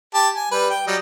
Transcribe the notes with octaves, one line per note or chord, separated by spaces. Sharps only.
G4 A5
G#5
G3 B4
G5
F#3 G3 D#5